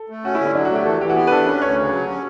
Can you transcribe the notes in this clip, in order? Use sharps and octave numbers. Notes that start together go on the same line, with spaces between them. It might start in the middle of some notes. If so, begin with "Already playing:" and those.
Already playing: A4
A3
C#4 F#4
E4
D3
E4
F#3 D4
F#4
A3
G4
E3 A4
E3 G4
F#4
B3 G4
B4
D4 A4
C#4 B4
D2 C#5
C#3
F#3
C#4